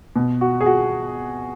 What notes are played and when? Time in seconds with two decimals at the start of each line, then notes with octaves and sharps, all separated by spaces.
0.16 B2
0.41 F#4
0.61 G#4
0.66 F#4